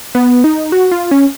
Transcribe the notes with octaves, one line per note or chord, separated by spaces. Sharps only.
B3
D#4
F#4
F4
C#4